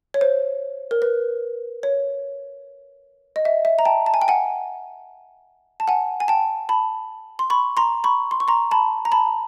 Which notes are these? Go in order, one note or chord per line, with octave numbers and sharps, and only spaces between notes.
C#5
C5
A#4
B4
C#5
D#5
E5
E5
A#5
G5 A5
A5
G#5
G5
F#5 G#5
A5
F#5 G#5
G#5
G5 A5
A5 B5
C6
B5 C#6
A#5 C6
B5 C#6
C6
C#6
A#5 C6
A5 B5
A#5
A5 B5